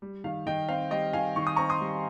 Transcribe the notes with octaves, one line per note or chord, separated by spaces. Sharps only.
G3
D#3 F5
D#3 D#5 G5
C4 F5
G3 D#5 G5
D#3 F5 G#5
D#3 C#6
D#6
C4 A#5 C#6
C6 D#6
G3